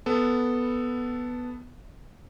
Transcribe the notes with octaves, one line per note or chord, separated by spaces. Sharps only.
B3 A4